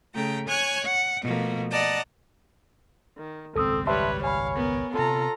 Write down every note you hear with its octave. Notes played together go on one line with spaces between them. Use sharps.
C#3 A3 G5 A#5
C#5 G#5 C#6 F#6 G#6
F#5
B2 F3 A3 A#3
D5 D#5 F#5 A5 A#5
D#3
G#1 C#2 F#2 C4 A4 D#6 E6
G3 B4 C#5 E5 A5 C6
C#5 F5 G#5 B5
B3 A#4
C3 B3 F4 A4 A#5